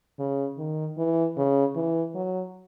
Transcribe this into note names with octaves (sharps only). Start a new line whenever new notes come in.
C#3
D#3
E3
C#3
E3
F#3